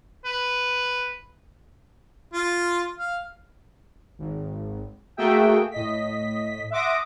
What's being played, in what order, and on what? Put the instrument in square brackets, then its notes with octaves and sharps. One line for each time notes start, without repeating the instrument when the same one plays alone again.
[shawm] B4
[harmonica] F4
F5
[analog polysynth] G#1
A3 A#3 F#4 G#4 E5 G5
A2 D#5 B6
E5 F#5 C6 D6 D#6 A#6